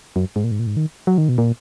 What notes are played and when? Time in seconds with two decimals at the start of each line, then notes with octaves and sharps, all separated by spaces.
0.16 F#2
0.36 G#2
0.44 A#2
0.51 G#2
0.59 A#2
0.67 G#2
0.77 D#3
1.07 F#3
1.18 D#3
1.29 B2
1.38 A#2